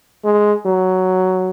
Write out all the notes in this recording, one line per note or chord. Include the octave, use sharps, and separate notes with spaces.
G#3
F#3